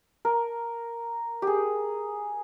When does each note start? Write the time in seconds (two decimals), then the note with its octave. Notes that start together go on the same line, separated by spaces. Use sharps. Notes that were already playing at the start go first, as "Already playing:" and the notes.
0.25 A#4
1.42 G4 G#4